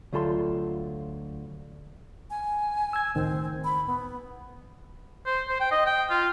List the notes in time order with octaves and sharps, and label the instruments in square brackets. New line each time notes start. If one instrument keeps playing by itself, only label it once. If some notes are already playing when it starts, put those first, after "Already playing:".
[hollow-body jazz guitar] D2 F#3 F4 A4 B5 C6
[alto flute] G#5
[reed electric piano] E6 G#6
[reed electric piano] C#2 A2 D#3 [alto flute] C4
[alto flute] B5
B3
[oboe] C5
C5
G5
D#5
G5
F4